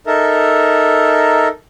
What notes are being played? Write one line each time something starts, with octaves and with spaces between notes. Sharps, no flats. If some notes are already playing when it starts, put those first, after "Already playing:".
D#4 A4 A#4 E5